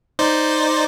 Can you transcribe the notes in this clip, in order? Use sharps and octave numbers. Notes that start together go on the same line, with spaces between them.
D#4 C5 D5